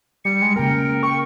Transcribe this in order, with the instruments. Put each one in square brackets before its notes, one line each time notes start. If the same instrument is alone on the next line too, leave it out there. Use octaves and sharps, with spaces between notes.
[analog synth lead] G3 [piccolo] C#7
[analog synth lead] G#3
[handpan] C#3 A#3 [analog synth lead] A#4 [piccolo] G5
[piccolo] G5 [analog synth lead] C#6